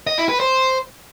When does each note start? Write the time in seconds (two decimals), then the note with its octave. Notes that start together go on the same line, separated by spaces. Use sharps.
0.07 D#5
0.18 E4
0.29 B4
0.40 C5